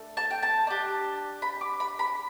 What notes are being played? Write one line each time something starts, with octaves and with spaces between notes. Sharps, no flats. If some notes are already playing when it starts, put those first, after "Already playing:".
Already playing: A3 D4 A4
A5
G5
A5
D4 G4
B5
D6
B5
B5